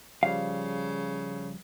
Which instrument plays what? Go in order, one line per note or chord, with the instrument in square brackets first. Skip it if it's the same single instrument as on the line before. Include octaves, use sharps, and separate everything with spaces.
[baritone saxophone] C#3 [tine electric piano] F3 G3 [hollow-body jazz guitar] F5